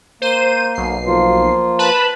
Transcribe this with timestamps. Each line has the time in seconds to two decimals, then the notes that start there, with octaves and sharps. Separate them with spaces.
0.22 A#3 C5 D#7
0.75 B1 C7
1.07 F3 A#3 F4
1.79 B4 A5 B5